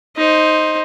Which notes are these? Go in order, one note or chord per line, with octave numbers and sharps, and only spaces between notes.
D#4 C5